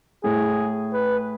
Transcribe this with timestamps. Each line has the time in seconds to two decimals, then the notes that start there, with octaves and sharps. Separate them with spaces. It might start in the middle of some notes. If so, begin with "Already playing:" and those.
0.24 A2 G#4
0.93 B4